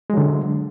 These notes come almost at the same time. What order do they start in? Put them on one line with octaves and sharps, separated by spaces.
G#3 F#3 D3